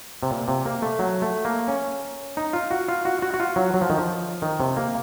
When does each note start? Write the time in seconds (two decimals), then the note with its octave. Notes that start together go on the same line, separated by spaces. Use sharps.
0.23 C3
0.31 A#2
0.48 C3
0.66 A#3
0.82 A3
0.99 F#3
1.22 A3
1.45 A#3
1.68 C#4
2.37 D#4
2.53 F4
2.71 F#4
2.88 F4
3.05 F#4
3.22 F#4
3.34 F#4
3.40 F4
3.56 F#3
3.74 F#3
3.81 F3
3.90 D#3
3.98 F3
4.42 D#3
4.60 C3
4.77 A#3